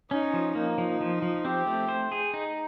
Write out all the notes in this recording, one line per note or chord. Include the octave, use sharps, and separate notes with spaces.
C#4 D#4
F3
A#3 D#4
F3
F3
F3
C4 G4
A3
C5
G#4
D#4